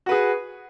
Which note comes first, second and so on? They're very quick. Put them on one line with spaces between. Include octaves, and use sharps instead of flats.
F#4 B4 G#4